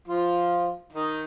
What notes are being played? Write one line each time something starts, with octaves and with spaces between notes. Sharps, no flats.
F3 F4
D#3 D#4